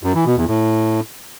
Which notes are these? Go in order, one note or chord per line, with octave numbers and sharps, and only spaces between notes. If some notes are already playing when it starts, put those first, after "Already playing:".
F#2
E3
B2
E2
A2